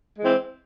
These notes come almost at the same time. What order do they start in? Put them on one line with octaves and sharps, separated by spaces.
G#3 E3 C4